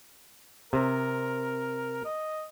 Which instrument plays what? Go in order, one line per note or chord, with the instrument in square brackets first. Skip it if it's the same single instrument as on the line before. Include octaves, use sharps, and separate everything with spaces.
[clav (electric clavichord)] C3 [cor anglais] A#4
[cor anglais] D#5